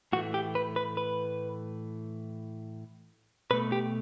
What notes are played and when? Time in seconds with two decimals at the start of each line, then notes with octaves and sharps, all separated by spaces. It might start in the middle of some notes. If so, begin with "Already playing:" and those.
0.13 A2 E3 A3 F#4
0.34 G4
0.55 B4
0.76 B4
0.97 B4
3.51 B2 A3 B4
3.72 G4